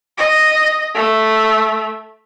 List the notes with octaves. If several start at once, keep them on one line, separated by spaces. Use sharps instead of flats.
D#5
A3